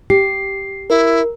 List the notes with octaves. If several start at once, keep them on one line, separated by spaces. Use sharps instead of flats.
G4 C7
E4 A#4